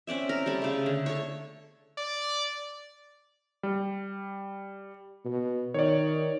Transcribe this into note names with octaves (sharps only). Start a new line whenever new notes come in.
C4 C#4 D5 E5
A#4
G3 A4 D5
C#3 A3
D3
A4 C#5
D5
G3
B2
D#3 C#5 D5